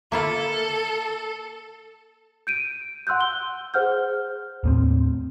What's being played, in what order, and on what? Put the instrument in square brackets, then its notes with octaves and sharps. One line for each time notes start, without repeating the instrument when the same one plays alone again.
[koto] A#3 E4 F4 [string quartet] A4
[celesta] G6 D7 D#7
F#5 C6 E6 F#6 G6
G7
G#4 C5 F#5 F6 G6
[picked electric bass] D#2 A2 C4